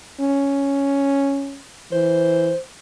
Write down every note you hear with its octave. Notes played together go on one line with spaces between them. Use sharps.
C#4
E3 C5